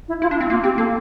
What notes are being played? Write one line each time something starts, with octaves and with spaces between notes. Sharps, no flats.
E4
E4 F4
D4
E4
C4
A#3 F4
C4 G4
A#3 A4